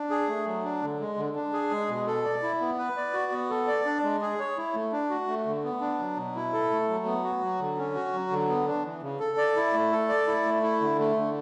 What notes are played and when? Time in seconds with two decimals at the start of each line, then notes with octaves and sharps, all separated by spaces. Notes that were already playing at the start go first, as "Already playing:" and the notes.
Already playing: D4
0.10 G#4
0.28 A3
0.46 F#3
0.64 D4
0.82 D3
1.00 G#3
1.17 D3
1.35 D4
1.53 G#4
1.71 G#3
1.89 B2
2.07 A4
2.24 D5
2.42 E4
2.60 B3
2.78 B4
2.97 D5
3.13 F#4
3.32 B3
3.50 A4
3.67 D5
3.86 D4
4.04 G#3
4.21 G#4
4.39 C#5
4.57 E4
4.74 A3
4.92 D4
5.10 F#4
5.28 A3
5.46 D3
5.64 B3
5.81 D4
5.99 F#3
6.17 B2
6.35 E4
6.53 A4
6.71 A3
6.89 F#3
7.05 B3
7.24 F#4
7.42 F#3
7.60 D3
7.77 C#4
7.95 F#4
8.13 F#3
8.30 D3
8.49 B3
8.67 D4
8.85 E3
9.02 C#3
9.20 A4
9.38 D5
9.56 E4
9.73 A3
9.92 A4
10.09 D5
10.27 E4
10.45 A3
10.63 E4
10.81 D3
10.99 A3
11.16 D3